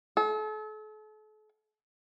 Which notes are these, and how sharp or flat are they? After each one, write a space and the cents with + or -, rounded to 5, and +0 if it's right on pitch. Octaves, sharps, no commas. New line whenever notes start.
A4 -40